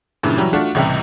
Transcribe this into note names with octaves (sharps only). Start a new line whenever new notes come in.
G2 A#2 C#3 E3
E3 F#3 G3
A3 D4 F4 F#4
C#2 A2 C3 E3 G3